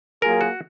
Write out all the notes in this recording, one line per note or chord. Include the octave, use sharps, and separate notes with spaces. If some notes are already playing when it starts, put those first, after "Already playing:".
F#3 A#3 F4 G#4 A#4
F#4